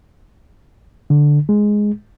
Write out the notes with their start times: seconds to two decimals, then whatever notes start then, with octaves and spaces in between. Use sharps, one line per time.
1.10 D3
1.49 G#3